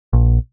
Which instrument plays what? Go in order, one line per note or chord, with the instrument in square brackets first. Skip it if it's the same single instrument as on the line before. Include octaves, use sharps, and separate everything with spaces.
[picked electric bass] A#1